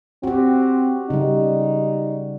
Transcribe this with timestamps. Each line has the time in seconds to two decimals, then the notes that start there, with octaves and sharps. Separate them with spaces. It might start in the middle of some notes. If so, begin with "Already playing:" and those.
0.23 C4 F#4 G4
1.10 C#3 G3 D#4